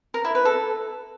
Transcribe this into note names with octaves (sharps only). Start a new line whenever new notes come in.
A#4
E4
B4
A4